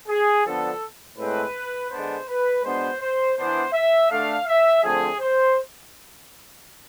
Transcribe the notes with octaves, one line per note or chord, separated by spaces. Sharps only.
G#4
D3 F3 B3 D4 A4
A2 G#3 C4 B4
D3 G#3 B3 D4 C5
B4
B2 G#3 B3 D4 C5
C5
E3 B3 D4 C5
E5
D3 A3 D4 F5
E5
D3 F3 A3 C4 G#4
C5